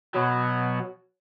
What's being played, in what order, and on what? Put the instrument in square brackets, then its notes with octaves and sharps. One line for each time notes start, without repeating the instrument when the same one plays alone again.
[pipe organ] B2 B3 [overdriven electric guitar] F#3 [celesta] F#4 C#5